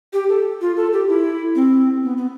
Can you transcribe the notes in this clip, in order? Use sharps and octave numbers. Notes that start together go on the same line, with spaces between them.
G4
A4
F4
A4
G4
E4
C4
B3
B3